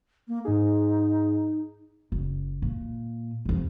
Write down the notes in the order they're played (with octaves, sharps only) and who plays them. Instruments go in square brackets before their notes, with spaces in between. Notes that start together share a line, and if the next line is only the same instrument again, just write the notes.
[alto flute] A#3
[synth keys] G#2 G#4 [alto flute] D#4
[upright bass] F#1
A#2
C2 F2